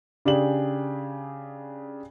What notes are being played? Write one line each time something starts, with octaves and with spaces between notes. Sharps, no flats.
C#3 D4 G4 G#4 F#7